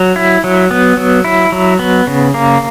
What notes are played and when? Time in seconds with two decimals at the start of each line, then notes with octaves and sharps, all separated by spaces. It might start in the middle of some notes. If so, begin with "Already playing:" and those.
Already playing: F#3
0.16 E4
0.44 F#3
0.71 B3
0.97 F#3
1.25 E4
1.52 F#3
1.79 B3
2.07 C#3
2.34 A#3